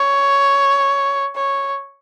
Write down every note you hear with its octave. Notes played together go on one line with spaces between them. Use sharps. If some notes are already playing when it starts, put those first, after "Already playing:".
Already playing: C#5
C#5